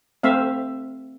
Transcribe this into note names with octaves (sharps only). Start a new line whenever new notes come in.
A3 C4 E5 F5